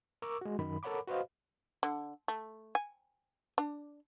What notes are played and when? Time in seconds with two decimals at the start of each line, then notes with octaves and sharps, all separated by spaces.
0.22 A#4 C#6 D6 E6
0.41 G#3 F#4
0.59 F#2 D#3 B5
0.83 A4 A#4 C#5 F#5 B5 D6
1.07 F#4 B4 C5 D#5 F5
1.83 D3
2.28 A3
2.75 G#5
3.58 D4